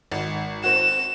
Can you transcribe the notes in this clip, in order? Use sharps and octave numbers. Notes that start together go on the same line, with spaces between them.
G#1
C4 F#4 E7